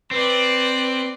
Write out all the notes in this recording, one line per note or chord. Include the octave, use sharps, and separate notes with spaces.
C4 B4 D5